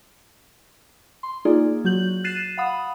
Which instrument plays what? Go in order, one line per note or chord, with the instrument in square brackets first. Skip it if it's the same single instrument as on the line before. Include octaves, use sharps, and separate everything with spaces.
[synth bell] C6
A#3 D#4 F4 G#4 D5
F#3 F#4 G6 F#7
F#6 A6 C7 D#7 E7
F5 F#5 B5 D#6